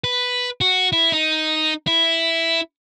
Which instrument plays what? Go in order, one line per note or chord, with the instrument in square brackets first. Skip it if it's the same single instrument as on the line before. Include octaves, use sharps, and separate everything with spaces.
[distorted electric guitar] B4
F#4
E4
D#4
E4